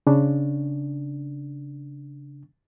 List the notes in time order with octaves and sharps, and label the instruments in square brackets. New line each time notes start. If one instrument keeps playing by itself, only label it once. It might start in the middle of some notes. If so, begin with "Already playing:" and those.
[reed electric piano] C#3 D4